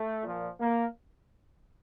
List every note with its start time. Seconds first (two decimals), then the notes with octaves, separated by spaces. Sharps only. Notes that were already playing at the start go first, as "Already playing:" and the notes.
Already playing: A3
0.23 A#2 F3
0.60 A#3